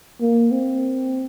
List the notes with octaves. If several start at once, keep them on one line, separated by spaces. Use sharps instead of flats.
A#3
C4